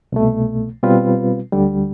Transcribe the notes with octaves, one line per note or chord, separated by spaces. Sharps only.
C2 B2 A3
B2 G3 C4 F4 B4
D2 D3 G3